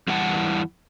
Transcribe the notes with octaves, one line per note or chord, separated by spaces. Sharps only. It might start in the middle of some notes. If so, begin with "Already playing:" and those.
E2 E3 G3 E4 F#5 A5